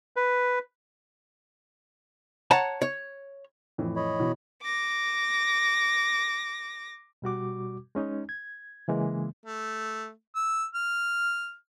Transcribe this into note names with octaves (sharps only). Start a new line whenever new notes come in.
B4
C#5 F#5 A5 A#5
C#5
F2 A2 E3
C#5 D#5 B5
B2 E3
D6 A#6
B2 G3 F#4 D6
G#3 C#4 D#4
G#6
C#3 E3 G#3 A#3
A3
E6
F6